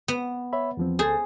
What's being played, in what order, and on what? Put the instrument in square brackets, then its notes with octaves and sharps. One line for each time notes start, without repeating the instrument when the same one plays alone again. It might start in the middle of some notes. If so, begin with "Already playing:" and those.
[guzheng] B3
[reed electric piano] C#5 E5 B5
E2 F3 C4
[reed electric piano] D2 A4 A6 [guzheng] G#4 C5